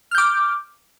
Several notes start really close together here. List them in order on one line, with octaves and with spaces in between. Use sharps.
F6 G6 D6